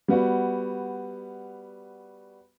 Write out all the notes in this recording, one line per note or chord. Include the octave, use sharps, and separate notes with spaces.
G3 B3 F#4